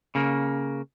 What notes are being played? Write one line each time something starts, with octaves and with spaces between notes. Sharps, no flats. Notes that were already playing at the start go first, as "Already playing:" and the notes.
C#3 A#3